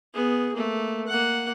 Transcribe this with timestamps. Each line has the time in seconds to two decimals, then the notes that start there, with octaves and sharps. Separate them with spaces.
0.14 B3 G#4
0.54 A3 A#3
1.07 A#3 F#5